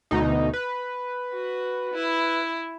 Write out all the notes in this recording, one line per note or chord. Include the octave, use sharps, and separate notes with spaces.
D2 B2 D#4
B4
F#4
E4